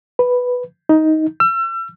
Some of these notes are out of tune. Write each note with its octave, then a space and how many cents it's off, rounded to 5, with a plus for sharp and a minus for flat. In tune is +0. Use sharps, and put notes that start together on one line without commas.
B4 +0
D#4 +10
E6 +40